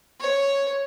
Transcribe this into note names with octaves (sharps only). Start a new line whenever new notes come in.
C#5